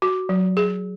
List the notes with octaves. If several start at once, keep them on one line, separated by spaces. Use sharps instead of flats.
F#4
F#3
G#4